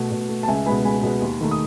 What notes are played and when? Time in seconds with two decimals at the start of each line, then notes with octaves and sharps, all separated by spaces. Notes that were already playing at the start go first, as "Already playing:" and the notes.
Already playing: B2 A3
0.11 B2
0.29 A3
0.43 A5
0.48 C#2 E5 G#5
0.66 B2 G#3 B3 G#5 B5
0.85 C#2 G#5 B5
1.03 B2 G#3 B3
1.22 D#2
1.41 D#3 A3
1.51 D#6